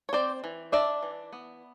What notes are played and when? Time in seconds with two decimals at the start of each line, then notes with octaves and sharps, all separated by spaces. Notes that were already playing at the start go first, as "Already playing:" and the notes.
0.09 C#5
0.13 C4 C5 D5
0.44 E3
0.72 D4 D5 E5
1.03 E3
1.33 B3